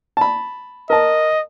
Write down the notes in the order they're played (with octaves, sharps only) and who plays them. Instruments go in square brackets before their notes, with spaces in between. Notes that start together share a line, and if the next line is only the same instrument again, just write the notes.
[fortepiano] A5 B5
[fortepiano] A#4 A5 [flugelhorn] D#5